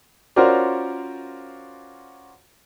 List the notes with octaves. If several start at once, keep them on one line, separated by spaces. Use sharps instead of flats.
C#4 F4 F#4 A#4 C5 D5